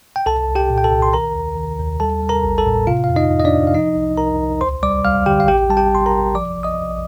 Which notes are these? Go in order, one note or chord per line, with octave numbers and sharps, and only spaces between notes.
G5
C2 A4 A5
C2
G4 G5
A#2
G5
A4 A5
C2
C6
D#3 A#4 A#5
D#2
D#3
D#2
G3 A4 A5
G3
A#4 A#5
A1
A4 A5
A2
C3 F4 F5
F5
F2
D#4 D#5
F2
D#5
D4 D5
C3
F5
F3 D#4 D#5
C2
C2 A#4 A#5
C2
D2 C5 C6
G3 D5 D6
G3 F5 F6
D3 G4 G5
F5
A1 G4 G5
G3 A5
G4 G5
A1 C6
A#4 A#5
A1
F3 D5 D6
A#1
D#5 D#6
A#1